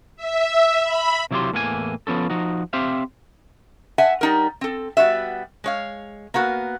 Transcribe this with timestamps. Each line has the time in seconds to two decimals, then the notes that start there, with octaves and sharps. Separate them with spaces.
0.16 E5
0.83 B5
1.31 C3 F#3 E4 F4 G4 C6
1.53 E2 A2 E3 A#3 A4 G#5
2.07 F3 B3 C#4 A4
2.30 F3 D#4 F#4
2.73 C4 G4 C5 E5 F5
3.98 E5 F#5 G#5 A5
4.21 G3 D#4 A#4
4.61 C4 A4
4.97 G3 B3 F#4 E5
5.64 G#3 C#5 F5
6.34 A#3 B3 F#4 A#4